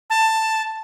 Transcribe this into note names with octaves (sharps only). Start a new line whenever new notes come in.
A5